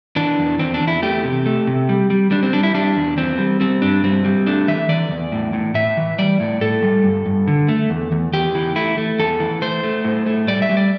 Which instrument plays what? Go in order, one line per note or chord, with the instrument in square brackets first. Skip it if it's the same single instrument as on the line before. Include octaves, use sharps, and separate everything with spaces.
[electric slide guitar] E3 D4
E2
E2 C4
D4
E2
E4
A3 G4
C3
A3
C3
G3
G3
G3 D4
C4
G3 D4
E4
G3 D4
E2
E2 C4
G3
G3 C4
G2 D4
G3 C4
G3
A3 D4
E3 E5
E3 D5
E2
A2
A2
A2 E5
E3
G3 D5
A2
A2 A4
G3
G2
G2
D3
A3
E2
E2
E2 G4
E3
A3 E4
A3
E2 A4
E3
A3 C5
A3
A2
A3
G3 D5
E5
G3
D5